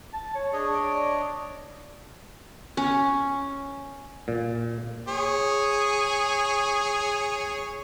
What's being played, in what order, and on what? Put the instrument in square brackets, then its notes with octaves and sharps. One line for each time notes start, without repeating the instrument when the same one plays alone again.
[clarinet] A5
C#5
[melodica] D4 C#5 D#5 [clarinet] G#4
[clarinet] D5
[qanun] C#4
[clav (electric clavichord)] A#2
[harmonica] G#4 C#5